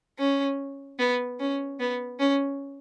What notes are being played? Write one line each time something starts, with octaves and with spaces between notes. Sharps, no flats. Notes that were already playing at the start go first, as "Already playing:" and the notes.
C#4
B3
C#4
B3
C#4